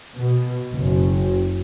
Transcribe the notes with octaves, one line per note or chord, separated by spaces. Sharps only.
B2
F#1